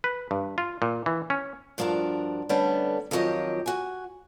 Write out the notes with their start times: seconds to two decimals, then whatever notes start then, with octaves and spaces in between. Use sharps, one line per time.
0.04 B4
0.31 G2
0.58 F4
0.82 A#2
1.06 E3
1.30 C#4
1.78 G2 F3 D4 F#4 A#4
2.49 D3 G3 A3 B3 C#4 D4
3.11 F2 D#3 F3 F#3 G4 D#5
3.66 F#4 G#5